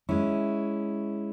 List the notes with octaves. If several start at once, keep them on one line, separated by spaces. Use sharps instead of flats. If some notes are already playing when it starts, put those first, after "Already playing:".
G#3 C#4 E4